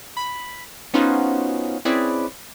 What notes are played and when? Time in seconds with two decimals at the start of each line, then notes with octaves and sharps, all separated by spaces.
0.17 B5
0.94 B3 C#4 D#4 F4 F#4 C5
1.85 C4 C#4 E4 G#4 B4 D5